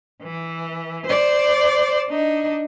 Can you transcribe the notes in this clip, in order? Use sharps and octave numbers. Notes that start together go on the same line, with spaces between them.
E3
C5 D5
D4 D#4